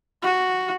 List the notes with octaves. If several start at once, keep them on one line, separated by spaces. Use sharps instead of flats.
F#4